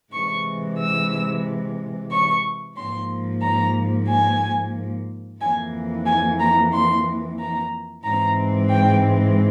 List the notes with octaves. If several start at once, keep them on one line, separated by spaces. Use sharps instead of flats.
C3 E3 G#3 C#6
E6
C#6
G#2 F3 A#3 C6
A#5
G#5
F2 E3 A#3 G#5
G#5
A#5
C6
A#5
G#2 E3 G#3 C4 A#5
G5